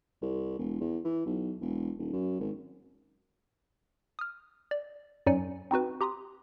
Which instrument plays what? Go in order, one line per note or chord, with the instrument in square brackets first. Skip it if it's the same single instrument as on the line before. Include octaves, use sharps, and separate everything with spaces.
[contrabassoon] C2
E1
E2
E3
B1
E1
D#1
F#2
G#1
[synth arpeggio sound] D#6 F6
D5
F#2 F#3 D#4 D5 G#5 C#7
C4 D#4 F#4 B4
G4 A#5 C6 D#6